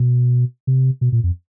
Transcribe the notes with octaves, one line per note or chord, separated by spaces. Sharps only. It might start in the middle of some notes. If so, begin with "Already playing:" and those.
Already playing: B2
C3
B2
A#2
F2